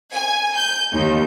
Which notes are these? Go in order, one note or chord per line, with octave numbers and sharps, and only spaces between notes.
G#5
G6
D#2